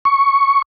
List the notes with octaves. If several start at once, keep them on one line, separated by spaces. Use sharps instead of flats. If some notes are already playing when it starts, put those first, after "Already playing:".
C#6